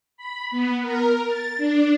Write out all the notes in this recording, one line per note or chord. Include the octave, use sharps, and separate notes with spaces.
B5
B3
A#4
A6
D4